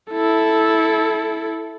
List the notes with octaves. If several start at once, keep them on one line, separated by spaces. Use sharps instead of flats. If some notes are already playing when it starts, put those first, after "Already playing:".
E4 A4